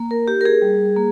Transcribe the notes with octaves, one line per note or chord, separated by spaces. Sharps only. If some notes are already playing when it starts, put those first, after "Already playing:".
Already playing: A#3
A#4
D#4 G4
A#4
G#4
G3
A#3